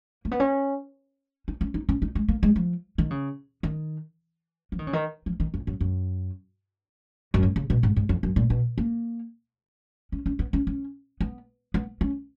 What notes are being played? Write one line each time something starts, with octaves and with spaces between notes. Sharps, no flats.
A#3
B3
C#4
D#4
C#4
D#4
C#4
D#4
G#3
A#3
G#3
F3
D#3
C#3
D#3
F3
D#3
C#3
D#3
F3
D#3
F2
F#2
F#2
F#2
G#2
C#3
B2
G#2
G#2
F2
F#2
A#2
B2
A#3
C#4
C#4
B3
C#4
C#4
B3
B3
C#4